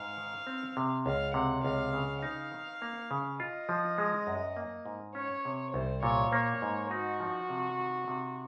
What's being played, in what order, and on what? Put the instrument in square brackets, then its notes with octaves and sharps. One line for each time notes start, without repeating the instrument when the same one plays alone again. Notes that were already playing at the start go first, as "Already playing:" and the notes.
Already playing: [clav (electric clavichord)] G#2 [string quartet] F5
[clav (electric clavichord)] D#3
C4
C3
[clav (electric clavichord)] C#2 [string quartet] F5
[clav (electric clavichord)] C3 [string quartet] F#5
[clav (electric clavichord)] C#2 [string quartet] F5
[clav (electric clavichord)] C#3
[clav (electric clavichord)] D#4 [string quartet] F5
[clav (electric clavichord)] D#3
A#3
C#3
[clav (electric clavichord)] F4 [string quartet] D#5
[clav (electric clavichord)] F3
G#3
F#2
A#3
G#2
[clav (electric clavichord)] C#4 [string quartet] C#5
[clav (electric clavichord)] C3
[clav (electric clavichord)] C2 [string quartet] C5
[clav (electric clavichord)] A#2 [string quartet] C#5
[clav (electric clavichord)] A#3 [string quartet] C#5
[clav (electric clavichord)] G#2
[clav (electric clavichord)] D#4 [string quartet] F#4
[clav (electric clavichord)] F3
C3
D#3
C3